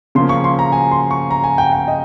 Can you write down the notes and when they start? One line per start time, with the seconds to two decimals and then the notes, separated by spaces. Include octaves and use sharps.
0.15 C#3 F3 A#3 C6
0.29 C#6
0.44 C6
0.59 A#5
0.72 G#5
0.91 C6
1.11 C#6
1.31 A#5
1.44 G#5
1.58 G5
1.73 G5
1.88 D#5